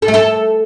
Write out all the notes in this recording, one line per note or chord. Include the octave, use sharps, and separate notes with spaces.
A4
A3
A4